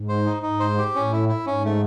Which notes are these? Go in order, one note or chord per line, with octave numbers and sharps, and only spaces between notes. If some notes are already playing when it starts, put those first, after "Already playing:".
Already playing: G#2
C5
D#4
G#2 D#4
C5
G4
A2 C#4
E4
E4
G#2 C#4
A3